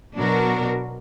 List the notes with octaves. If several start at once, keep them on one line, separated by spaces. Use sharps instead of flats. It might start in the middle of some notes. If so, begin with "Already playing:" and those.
B2 F#3 D4 F#4 A#4